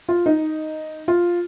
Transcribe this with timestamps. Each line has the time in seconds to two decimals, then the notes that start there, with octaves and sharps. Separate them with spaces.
0.09 F4
0.26 D#4
1.08 F4